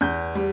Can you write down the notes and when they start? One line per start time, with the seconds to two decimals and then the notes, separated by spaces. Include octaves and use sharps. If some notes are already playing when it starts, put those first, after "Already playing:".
0.01 E2 G6
0.35 G3